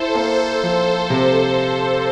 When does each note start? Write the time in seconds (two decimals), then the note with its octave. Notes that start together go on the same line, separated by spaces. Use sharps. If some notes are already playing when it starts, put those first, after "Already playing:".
Already playing: E4 A4 C5
0.15 A#3
0.63 F3
1.10 C3